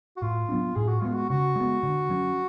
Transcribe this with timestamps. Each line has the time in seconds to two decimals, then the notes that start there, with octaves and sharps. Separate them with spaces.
0.17 F#4
0.22 A2 F4
0.49 F#3 B3 D4
0.76 A2 G#4
0.88 F#4
1.01 G#3 B3 F4
1.14 F#4
1.30 C#3 F#4
1.56 G#3 B3
1.83 D3
2.10 F#3 C#4